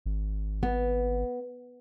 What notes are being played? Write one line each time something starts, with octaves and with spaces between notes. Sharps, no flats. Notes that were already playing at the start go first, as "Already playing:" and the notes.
G#1
B3